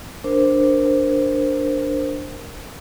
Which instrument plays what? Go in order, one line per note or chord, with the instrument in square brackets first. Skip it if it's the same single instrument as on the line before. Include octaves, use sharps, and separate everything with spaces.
[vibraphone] D4 A#4 C5